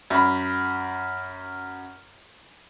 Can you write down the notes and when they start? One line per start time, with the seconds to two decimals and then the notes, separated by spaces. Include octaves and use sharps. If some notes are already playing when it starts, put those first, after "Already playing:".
0.10 F#2 B5